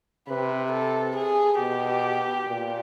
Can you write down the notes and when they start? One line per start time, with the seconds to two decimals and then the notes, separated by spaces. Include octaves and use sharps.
0.28 C3 B4
0.72 A4
1.16 G#4
1.59 B2 G4
2.47 A#2